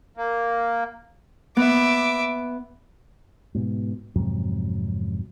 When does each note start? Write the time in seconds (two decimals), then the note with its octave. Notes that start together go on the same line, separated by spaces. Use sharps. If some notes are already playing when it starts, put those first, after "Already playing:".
0.17 A#3
1.57 B3 E5 D6
3.55 G#2 B2
4.16 F2 G#2 C3 F#3